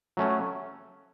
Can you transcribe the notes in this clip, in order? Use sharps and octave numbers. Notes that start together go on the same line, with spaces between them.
F#3 A3 C#4